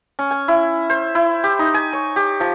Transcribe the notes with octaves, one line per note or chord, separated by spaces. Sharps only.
C#4
G#5
E4
C5
E4
G4
D#4
G#5
C#5
G4
F3